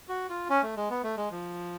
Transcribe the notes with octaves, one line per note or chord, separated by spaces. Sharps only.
F#4
F4
C#4
A3
G#3
B3
A3
G#3
F3